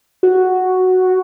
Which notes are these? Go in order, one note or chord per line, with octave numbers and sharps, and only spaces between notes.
F#4